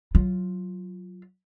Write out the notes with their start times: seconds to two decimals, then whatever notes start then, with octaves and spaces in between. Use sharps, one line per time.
0.15 F#3 F4